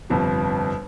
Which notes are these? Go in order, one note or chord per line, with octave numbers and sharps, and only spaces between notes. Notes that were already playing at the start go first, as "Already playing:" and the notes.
G1 F2 C3